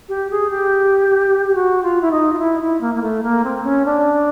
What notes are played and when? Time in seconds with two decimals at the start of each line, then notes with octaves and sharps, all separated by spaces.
0.09 G4
0.31 G#4
0.50 G4
1.48 G4
1.55 F#4
1.83 F4
2.01 E4
2.11 D#4
2.32 F4
2.39 E4
2.61 E4
2.81 A#3
2.95 A#3
3.02 A3
3.23 A#3
3.44 C4
3.64 C#4
3.86 D4